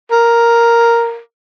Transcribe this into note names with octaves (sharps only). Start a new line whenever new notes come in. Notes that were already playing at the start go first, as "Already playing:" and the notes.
A#4